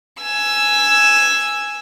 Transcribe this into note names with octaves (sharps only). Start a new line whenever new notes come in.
G#5 E6